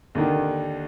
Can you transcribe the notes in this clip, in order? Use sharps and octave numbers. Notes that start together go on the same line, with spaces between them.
D#2 D3 D#3